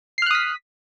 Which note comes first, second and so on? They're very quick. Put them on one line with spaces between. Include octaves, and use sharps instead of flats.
C7 F6 F#6 D#6 B6